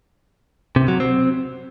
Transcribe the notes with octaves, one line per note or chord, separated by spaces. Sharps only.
C3
F#3
C4